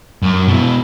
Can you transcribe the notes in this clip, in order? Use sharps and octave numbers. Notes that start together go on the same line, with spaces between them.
F#2
B2 E3